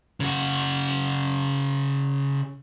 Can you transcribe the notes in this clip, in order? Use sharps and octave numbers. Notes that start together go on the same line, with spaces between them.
C#3 F#4